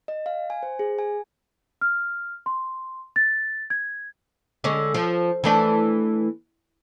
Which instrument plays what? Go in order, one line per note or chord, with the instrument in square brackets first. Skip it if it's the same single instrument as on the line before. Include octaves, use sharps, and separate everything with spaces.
[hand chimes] D#5
F5
G#5
C5
G#4
G#5
[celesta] F6
C6
A6
G#6
[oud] D3 G#3 C#4
F3
E3 A3 D4